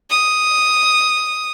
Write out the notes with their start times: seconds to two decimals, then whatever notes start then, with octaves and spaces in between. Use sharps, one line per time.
0.10 D#6